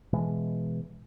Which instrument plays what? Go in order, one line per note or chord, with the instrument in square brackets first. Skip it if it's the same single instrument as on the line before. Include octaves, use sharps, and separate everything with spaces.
[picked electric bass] B2 E3 G#3